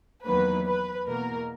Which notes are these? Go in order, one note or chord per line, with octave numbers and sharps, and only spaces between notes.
E2 D#3 F#3 A#3 B4
B4
E2 B2 A#3 A#4